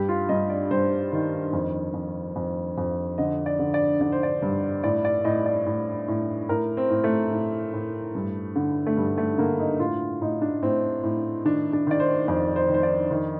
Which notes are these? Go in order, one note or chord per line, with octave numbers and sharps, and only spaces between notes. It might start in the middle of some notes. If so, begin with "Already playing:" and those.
Already playing: G2 G4
F4
G2 D#5
D5
G2 C5
D#3
F2
F2
F2
F2
D3 D#5
D5
D3
D5
D3 D5
C5
D5
G2
A2 D5
D5
A2 D#5
D5
A2
A2
A2 A#4
C4
A2
A3
A2
A2
G2
D3
A3
G2 G3
A3
D3 A#3
D#4
A2 F4
A2 D#4
D4
A2 C4
A2
D#3 D4
D4
D#3 D5
C5
F2 C5
C5
D#3
C5
D5
D#3